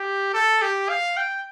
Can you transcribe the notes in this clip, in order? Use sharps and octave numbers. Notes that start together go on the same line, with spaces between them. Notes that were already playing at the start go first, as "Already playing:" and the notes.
Already playing: G4
A4
G4
F5
G5